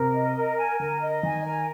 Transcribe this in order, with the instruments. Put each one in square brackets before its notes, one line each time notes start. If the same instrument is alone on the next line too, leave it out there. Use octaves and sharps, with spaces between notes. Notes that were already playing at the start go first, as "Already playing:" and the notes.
Already playing: [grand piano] C3 [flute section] A#4
[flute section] D#5
A#4
G#5
[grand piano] D3 [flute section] A#4
[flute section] D#5
[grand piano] D#3 [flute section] G#5
[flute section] A#4